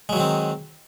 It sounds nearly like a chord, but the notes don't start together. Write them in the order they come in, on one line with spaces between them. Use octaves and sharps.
G#3 F#3 D#3 C4